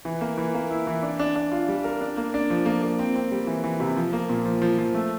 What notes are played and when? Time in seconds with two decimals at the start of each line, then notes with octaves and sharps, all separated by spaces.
0.05 E3
0.21 A#3
0.38 E3
0.54 A#3
0.70 E4
0.87 E3
1.03 D4
1.19 D4
1.35 D4
1.52 F4
1.69 G3
1.84 A#4
2.01 D4
2.17 A#3
2.34 D4
2.50 F3
2.65 A#3
2.82 A#3
2.99 C4
3.15 C4
3.32 G3
3.47 E3
3.64 E3
3.80 C3
3.97 F3
4.13 A#3
4.29 A#2
4.45 F3
4.62 F3
4.78 F3
4.94 A3